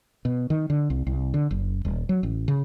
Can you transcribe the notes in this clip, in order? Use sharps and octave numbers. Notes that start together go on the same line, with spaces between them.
B2
D#3
D3
C2
C2
D3
F#1
D#1
F#3
A1
C#3